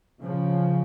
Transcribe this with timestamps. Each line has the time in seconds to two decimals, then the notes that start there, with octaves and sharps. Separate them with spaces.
0.20 C#3 F3